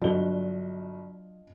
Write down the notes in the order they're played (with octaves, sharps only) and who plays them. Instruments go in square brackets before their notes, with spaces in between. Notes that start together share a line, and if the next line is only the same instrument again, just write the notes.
[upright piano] G1 F#4 G7 [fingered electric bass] F#3 [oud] D4 [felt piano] F4 D#5